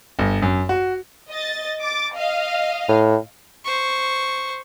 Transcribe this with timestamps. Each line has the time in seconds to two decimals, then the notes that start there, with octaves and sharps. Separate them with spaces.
0.19 G1
0.42 F#2
0.69 F#4
1.30 D#5 A6
1.80 D6 A6
2.13 D#5 F5
2.88 A2
3.65 C5 C#6